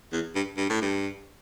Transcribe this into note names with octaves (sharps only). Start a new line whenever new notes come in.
E2
G2
G2
A2
G2